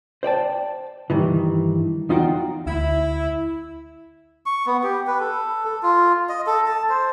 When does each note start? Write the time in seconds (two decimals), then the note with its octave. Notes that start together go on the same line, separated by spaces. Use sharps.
0.23 C5 D5 G5 A5
1.10 G2 D#3 E3
2.09 E2 D#4 F4 F#4 F#5 G5
2.66 D2 E4
4.46 C#6
4.67 B3
4.83 G4
5.07 B4
5.20 A4
5.65 A4
5.83 F4
6.29 D#5
6.47 A4
6.66 A5
6.89 C5